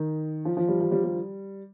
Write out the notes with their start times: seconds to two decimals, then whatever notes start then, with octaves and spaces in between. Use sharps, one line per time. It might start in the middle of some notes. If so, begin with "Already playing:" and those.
Already playing: D#3
0.45 F3
0.57 F3
0.68 G3
0.81 F3
0.92 G3
1.04 G3